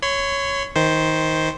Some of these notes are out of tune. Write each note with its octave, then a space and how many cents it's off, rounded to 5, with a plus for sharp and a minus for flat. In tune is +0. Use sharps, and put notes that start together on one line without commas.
C#5 +0 C6 -45
D#3 +20 C5 +0